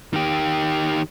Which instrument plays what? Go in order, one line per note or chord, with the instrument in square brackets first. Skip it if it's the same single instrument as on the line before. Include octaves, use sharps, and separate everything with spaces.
[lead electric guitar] D#3 G4